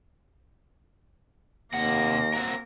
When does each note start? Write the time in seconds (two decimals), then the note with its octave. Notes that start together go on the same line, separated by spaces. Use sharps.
1.74 D#2 C3 A#3 F#5 A#6
2.34 C4 F#4 A#4